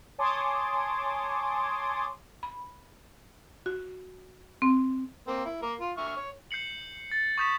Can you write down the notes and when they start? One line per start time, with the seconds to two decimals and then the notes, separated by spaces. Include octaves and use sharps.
0.18 C#5 G#5 A5 C6 D6 D#6
2.43 B5
3.66 F#4
4.62 C4
5.28 A#3 C4
5.45 E4
5.62 A#3 A#4
5.81 F4
5.97 E5 C#6 F6
6.17 C#5
6.51 G6 C7 C#7 F#7
7.12 A6
7.38 C#6 D#6 G6 B6 E7